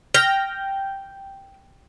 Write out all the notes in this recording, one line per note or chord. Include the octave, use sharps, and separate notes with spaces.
G5 F6 A#6